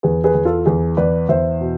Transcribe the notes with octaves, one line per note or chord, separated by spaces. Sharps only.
E2 G#4 B4
G#4 B4
E2
F4 A4
E2 G#4 B4
E2 B4 D5
E2 C5 E5
B2